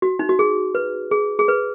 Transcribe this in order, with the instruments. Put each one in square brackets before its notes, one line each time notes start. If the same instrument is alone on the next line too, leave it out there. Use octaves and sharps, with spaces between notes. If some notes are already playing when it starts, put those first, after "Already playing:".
[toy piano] F#4
D#4
F#4
G#4
B4
G#4
G#4
B4